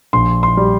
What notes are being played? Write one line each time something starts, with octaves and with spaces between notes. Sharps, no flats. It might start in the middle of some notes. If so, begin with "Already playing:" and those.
A#1 C6
C6
G3